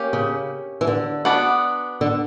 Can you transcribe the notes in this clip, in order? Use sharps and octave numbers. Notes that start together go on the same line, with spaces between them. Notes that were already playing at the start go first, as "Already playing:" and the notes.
Already playing: A#3 C#4 G4
C#3
E3
D3
B3 D4 F#4
D3